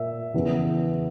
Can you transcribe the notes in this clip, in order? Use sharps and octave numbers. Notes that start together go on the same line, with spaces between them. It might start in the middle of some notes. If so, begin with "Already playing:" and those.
Already playing: A#2 A#3 E5
E2 C#3 E3 B3